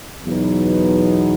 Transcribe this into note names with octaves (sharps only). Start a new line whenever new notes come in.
E2 B2 F#3 B3 D#4